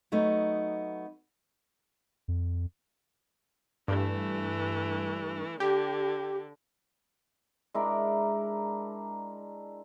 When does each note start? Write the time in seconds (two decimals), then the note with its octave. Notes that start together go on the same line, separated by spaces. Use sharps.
0.12 F#3 A3 B3 D#4
2.28 F2
3.88 G2 E3 A3
5.60 D3 G4
7.74 G#3 D4 E4 A#4